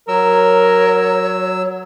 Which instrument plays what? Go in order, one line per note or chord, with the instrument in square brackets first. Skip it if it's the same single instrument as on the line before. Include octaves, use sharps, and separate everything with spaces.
[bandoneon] F#3 E6 [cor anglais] A#4 [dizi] C#5